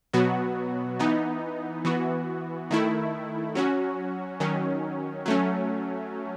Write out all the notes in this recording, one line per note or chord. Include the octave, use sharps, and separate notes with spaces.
B2 F#3 B3 F#4
E3 B3 D#4
E3 B3 F#4
D#3 A3 E4
F#3 C#4 F#4
D#3 F#3 C#4
F#3 A3 C#4